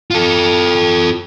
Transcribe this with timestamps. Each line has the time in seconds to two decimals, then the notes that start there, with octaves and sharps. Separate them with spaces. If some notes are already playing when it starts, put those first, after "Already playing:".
0.11 F4 A4